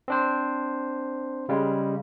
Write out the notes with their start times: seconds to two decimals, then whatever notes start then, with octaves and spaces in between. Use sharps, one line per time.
0.08 C4 D4 C5
1.49 C#3 G3 G#3